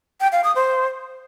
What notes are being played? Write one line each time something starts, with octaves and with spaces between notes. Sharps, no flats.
G5
F5
D#6
C5